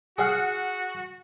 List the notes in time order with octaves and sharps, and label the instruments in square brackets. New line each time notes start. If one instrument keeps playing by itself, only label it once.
[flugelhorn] F#4 [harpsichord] G#4 F5 F#5